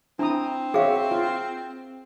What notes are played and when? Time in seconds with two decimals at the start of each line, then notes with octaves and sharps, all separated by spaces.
0.19 C4 D4 E4 A#5 D#6
0.74 F#4 G#4 C#5 E5 F5
1.11 F4